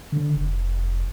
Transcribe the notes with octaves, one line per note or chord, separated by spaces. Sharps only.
D3
F1